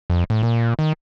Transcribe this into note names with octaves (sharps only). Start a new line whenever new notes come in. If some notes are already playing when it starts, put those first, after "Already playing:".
F2
A2
A#2
D#3